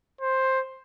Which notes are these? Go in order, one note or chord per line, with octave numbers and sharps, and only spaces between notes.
C5